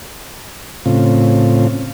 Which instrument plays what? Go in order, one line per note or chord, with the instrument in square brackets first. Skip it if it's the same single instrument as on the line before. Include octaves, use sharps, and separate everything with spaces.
[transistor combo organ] A2 C#3 C4 F4